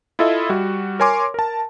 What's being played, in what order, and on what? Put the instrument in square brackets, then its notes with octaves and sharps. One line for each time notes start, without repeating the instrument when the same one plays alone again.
[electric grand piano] E4 F4 A4 D#5 E5
G3 F#4
A#4 C#5 G#5 C6 D6
A#4 A5